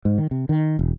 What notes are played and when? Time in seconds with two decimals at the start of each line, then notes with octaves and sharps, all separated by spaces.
0.05 G#2
0.18 D#3
0.31 C3
0.49 D#3
0.79 E1